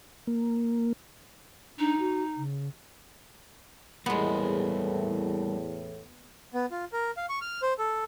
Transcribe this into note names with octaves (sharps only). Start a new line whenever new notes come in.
A#3
D4 D#4
F#4
C#3
E2 A2 G3 G#3 A#3 B3
B3
F4
A#4
F5
C#6
F6
C5
A4